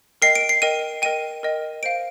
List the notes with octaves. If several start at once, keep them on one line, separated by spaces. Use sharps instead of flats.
A#4 D#5 G5 C7
D7
C7
A#4 D#5 G5 D#7
A#4 D#5 G5 D#7
A#4 D#5 G5
C5 F5 D7